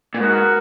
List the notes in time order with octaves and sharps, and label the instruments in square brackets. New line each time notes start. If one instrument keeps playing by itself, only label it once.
[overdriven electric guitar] A#2
[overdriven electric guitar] G#2 [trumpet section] B3 F#4 A#4